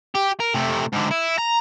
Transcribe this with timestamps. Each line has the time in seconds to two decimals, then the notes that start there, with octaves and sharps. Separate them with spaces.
0.15 G4
0.40 A#4
0.54 C3 A3
0.93 G#2 D3
1.11 E4
1.39 A#5